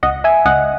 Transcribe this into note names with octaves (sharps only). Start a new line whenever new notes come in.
C#2 D#5 F#5
E5 G#5
C#2 D#5 F#5